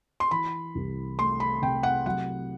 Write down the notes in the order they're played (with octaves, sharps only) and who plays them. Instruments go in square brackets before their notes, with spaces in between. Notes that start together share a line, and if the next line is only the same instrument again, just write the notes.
[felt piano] C6
[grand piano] E3 [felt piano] B5
[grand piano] C2
[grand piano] A3 [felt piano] C6
[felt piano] B5
[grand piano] C3 [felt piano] G5
[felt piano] F#5
[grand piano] F#3 [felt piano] F#5